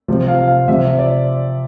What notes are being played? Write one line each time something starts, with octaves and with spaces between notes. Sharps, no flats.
C3 F3
F5
F5
C3 F3 E5
D5